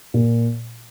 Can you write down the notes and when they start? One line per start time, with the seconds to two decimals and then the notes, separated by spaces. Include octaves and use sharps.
0.14 A#2